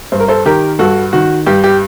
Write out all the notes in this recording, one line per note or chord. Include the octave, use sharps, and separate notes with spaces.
G2 C5
A#4
A4 C5
D#3 G4 A#4
G2 F#4 A4
D#3 F#4
G2 G4
G4